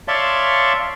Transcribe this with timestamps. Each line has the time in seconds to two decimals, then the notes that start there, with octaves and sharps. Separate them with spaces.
0.08 C#5 D5 E5 F5 A5 C6